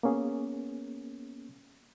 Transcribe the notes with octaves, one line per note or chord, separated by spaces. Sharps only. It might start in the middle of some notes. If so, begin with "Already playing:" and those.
A#3 B3 C#4 G#4